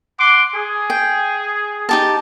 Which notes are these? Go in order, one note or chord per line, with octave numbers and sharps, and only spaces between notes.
F#5 C6 D6
G#4
G5
D#4 G4 A5